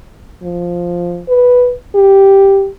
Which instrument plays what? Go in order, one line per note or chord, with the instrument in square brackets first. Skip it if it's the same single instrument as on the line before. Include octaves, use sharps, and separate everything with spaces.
[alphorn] F3
B4
G4